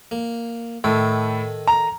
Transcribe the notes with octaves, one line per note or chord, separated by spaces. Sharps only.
A#3
A2 D#3 A4
A#5